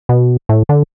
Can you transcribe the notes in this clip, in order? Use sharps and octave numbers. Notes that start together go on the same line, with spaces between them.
B2
A2
D3